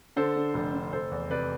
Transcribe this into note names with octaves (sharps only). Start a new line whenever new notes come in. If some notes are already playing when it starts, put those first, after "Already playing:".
D3 A4 C5
D3
F1
D3
F1 A4 C5
E2
C3 B4 D5